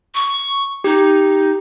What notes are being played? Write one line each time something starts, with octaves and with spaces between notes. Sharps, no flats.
C#6
D#4 G4